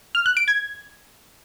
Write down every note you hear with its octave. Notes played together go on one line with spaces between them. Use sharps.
F6
F#6
D7
G#6